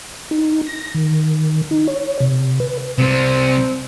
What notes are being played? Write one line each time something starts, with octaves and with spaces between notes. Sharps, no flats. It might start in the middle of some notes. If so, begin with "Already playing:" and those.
D#4
A#6
D#3
D#4
C#5
C3
B4
C3 G3 C4